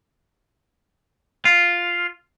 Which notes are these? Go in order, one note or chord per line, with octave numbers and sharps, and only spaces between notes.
F4